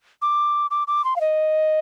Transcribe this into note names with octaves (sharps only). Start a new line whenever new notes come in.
D6
D6
D6
C6
F5
D#5